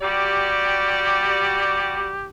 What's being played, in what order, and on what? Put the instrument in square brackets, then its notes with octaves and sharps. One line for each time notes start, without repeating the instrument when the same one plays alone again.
[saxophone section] G3 F#4 D5 [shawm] G4